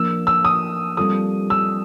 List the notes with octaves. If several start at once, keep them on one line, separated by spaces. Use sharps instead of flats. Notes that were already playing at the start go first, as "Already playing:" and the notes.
Already playing: F3 A#3 D4 E6
E6
D#6
G3 C4 F4 A4 D#6
E6